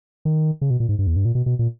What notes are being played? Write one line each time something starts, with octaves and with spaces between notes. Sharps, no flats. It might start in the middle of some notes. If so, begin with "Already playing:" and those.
D#3
C#3
B2
A#2
G#2
G2
E2
G2
A#2
B2
B2
A#2